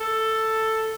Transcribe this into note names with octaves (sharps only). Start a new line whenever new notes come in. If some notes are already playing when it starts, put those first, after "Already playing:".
A4